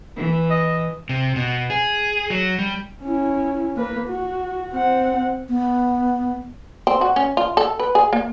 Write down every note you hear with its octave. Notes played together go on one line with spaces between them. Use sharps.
E3
D#5
C3
B2
G#4
F#3
G3
C#4 E4
A#3 B4
F#4
C4 F#5
B3
C4
F#4
C#4
F4
A4
B4
G#4
A#3